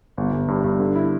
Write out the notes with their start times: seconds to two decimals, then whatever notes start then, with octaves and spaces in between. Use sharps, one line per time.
0.17 G1
0.33 G1
0.48 G2
0.64 G2
0.80 D3
0.96 E4